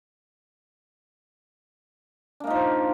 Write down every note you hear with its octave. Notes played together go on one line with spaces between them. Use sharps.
F3 A#3 D4 D#4